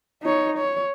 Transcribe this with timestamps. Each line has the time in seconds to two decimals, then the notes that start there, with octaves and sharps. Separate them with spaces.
0.23 D#4 C#5
0.58 C#5